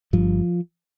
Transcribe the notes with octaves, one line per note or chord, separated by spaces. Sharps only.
G1 G2 F3